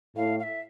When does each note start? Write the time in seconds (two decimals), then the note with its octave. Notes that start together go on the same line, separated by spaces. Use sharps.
0.16 A2 F5
0.39 F5
0.43 E5